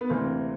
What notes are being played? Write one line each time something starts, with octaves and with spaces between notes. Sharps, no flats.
B3
D2 C3 E3 A#3 C4